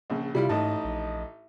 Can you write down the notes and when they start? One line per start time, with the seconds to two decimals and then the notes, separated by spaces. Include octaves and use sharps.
0.10 A#1 C#3
0.35 C3 G3 E4 F4
0.49 A1 G#2 D#4 A5
0.84 A#1